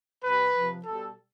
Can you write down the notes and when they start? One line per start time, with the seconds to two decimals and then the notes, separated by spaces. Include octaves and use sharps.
0.24 C3 G3 B4
0.55 C3 F3
0.85 B2 G3 A4